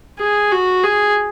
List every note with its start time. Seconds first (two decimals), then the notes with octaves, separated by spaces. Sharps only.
0.19 G#4
0.52 F#4
0.84 G#4